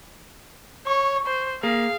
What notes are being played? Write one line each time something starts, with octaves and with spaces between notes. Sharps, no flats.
C#5 C#6
C5
A#3 G#4 F5